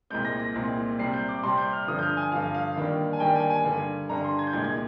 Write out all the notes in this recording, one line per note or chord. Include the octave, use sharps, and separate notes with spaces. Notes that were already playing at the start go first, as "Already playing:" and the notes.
C2 A#2 G#3 C4 G6
A#6
A#6
C2 A#2 G#3 C4
C3 G3 C4 C7
G6
D6
C3 G3 C4 C6
G6
F6
G2 D3 F3 D#6
G6
F6
G#5
G2 D3 F3 F5
F5
D#2 D#3 G3 D4
G#5
D#2 D#3 G3 D4 G5
G#5
G#5
G2 D3 G3
G2 D3 G3 A#5
C6
G#6
G6
C2 A#2 G#3 G#6
G#6